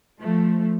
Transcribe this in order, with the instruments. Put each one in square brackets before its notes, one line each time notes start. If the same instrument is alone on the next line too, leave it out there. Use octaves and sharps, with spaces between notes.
[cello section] F3 A3